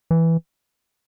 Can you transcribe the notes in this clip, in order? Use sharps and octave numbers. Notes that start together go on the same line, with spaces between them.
E3